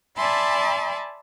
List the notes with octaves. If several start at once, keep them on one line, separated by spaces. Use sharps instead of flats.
D5 E5 G#5 A5 B5 C6